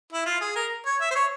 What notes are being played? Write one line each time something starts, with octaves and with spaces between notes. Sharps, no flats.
E4
F4
G#4
A#4
C#5
E5
C5
C#5